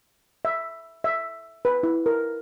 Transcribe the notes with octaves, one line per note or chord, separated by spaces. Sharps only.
E5
E5
B4
E4
A#4